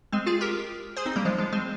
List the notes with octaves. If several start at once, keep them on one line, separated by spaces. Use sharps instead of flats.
G#3 C4
F4 G#4
G4 A#4
G#4 C5
C4 D#4
G3 A#3
F3 G#3
F3 G#3
G#3 C4